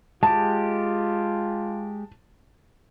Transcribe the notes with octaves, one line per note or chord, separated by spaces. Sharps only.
G#3 F4 G4 A5